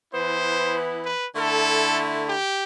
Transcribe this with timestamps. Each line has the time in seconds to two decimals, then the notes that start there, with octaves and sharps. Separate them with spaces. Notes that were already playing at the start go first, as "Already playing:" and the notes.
0.13 E3 B3 E4 C5
1.06 B4
1.36 D3 A3 E4 A4
2.27 G4